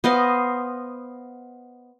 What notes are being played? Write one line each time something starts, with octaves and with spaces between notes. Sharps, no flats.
B3 C5 D#5 F5